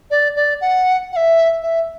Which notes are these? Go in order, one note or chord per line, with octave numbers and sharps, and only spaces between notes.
D5
D5
F#5
F#5
E5
E5